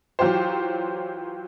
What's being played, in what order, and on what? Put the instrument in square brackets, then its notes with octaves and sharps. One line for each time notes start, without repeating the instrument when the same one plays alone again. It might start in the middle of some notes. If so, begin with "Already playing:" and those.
[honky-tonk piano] E3 F#3 F4 G4 C5